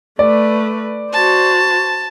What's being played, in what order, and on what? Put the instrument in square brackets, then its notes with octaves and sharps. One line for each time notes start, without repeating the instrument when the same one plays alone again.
[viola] A3 B4 [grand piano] D5
[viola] F#4 C5 [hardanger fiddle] A5